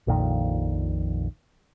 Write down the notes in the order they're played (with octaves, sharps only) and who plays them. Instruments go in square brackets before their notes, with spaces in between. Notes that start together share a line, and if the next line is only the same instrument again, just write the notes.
[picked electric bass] A#1 F2 A#2 D#3